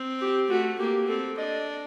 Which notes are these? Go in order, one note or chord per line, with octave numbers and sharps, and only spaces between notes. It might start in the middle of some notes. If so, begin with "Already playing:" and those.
Already playing: C4
G4
A3 F#4
A#3 G4
C4 A4
D4 D#5